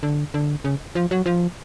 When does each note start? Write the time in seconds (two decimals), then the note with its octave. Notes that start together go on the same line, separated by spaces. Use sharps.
0.03 D3
0.34 D3
0.64 C#3
0.95 F3
1.11 F#3
1.26 F3